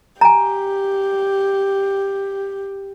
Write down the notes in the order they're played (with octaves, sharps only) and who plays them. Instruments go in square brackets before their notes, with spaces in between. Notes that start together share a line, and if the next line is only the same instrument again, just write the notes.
[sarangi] G4 [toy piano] G#5 A#5